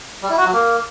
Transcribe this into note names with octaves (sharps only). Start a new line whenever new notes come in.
G3
E4
F#4
F#3
A#3